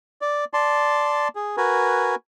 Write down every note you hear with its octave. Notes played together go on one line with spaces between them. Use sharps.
D5
D5 A5 C6
G#4
F#4 A#4 B4 G#5